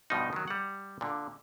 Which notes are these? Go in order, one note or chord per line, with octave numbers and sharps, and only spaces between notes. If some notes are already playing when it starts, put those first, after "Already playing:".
G2 B2 F3 D#4
D#3 F#3
G3 F#5
A#2 D3